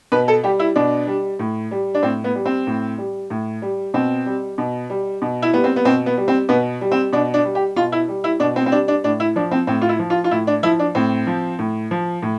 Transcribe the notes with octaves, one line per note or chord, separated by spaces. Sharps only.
B2 B4
A4
G3 G4
E4
B2 D4
G3
A2
G3
D4
A2 C4
B3
G3
C4
A2
G3
A2
G3
B2 C4
G3
B2
G3
B2
E4
G3 B3
C4
B3
B2 C4
B3
G3
C4
B2 B3
G3
C4
B2 D4
D4
G3
G4
B2 F4
E4
G3
E4
B2 D4
C4
C4
G3 D4
D4
A2 D4
E4
F3 D4
C4
A2 C4
F4
E4
F3
F4
F4
A2 E4
D4
F3 E4
D4
A2 C4
F3
A2
F3
A2